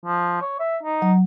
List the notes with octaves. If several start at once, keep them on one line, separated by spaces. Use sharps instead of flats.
F3
C#5
E5
D#4
F#3